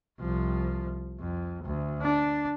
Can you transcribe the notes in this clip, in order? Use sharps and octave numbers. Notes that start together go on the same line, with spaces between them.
C2 F3
F2
D2
D4